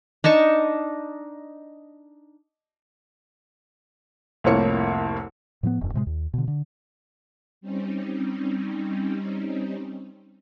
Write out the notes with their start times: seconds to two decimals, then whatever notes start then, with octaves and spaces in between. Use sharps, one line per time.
0.24 D4 D#4 A5 C#6
4.44 C2 F2 A2 A#3 C#5 C#7
5.63 A2 F3 A3 B3
5.81 E1 F#2
5.94 A2 C3 G3 G#3
6.07 D#2
6.34 B2 D3
6.48 D3
7.61 G3 C4 C#4 D#4